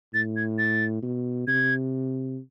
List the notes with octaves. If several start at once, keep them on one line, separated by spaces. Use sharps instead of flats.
A2 A6
G#6
A6
B2
C3 G#6